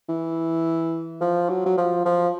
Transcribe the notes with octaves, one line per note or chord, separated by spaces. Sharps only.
E3
F3
F#3
F#3
F3
F3